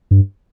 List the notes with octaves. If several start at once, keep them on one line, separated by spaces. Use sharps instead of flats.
G2